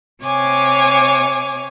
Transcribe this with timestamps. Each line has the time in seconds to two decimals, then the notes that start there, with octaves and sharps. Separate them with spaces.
0.23 C3 C#5 G#5 D6